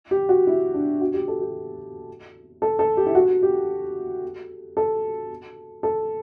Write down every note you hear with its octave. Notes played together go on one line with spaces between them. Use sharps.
G4
F#4
E4
D4
F#4
G4
A4
G4
A4
A4
G4
E4
F#4
G4
A4
A4